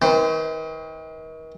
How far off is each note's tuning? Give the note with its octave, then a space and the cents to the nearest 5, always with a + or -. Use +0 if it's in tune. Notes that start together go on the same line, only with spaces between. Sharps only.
D#3 +40 C5 -40